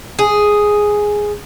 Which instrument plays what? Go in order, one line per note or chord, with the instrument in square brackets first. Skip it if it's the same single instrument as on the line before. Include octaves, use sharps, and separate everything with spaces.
[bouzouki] G#4